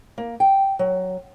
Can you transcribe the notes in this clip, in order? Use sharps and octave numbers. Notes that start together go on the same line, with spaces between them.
A#3
G5
F#3